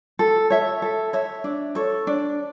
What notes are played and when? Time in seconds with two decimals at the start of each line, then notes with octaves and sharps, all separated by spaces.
0.19 A4
0.50 C#5 E5
0.82 A4
1.13 C#5 E5
1.44 D4
1.75 A4 C#5
2.07 D4